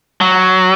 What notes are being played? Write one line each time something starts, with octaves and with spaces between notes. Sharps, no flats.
F#3